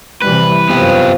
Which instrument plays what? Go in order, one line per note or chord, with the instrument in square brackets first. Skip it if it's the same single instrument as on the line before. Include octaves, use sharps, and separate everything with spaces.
[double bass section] C3 E3 G3 [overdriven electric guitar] B4
[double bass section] F#2 C3 [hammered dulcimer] F3 [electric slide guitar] B3 G4